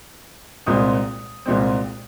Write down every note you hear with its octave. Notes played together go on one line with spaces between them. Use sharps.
C2 A#2 G#3 C4 D#6
C2 A#2 G#3 C4